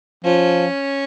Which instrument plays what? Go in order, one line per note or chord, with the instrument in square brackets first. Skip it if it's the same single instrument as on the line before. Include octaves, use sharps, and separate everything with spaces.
[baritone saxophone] F3 [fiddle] C#4